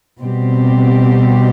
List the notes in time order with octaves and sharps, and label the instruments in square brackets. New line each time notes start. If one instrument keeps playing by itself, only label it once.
[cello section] B2 G3 C4 G4